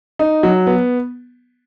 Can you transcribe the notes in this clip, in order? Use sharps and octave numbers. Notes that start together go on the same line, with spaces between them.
D#4
F#3
B3